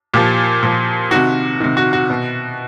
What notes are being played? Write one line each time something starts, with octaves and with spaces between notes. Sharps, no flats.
A#2 F3 G4
A#2 F3
C3 D#3 F#4
C3 D#3
F#4
F#4
B2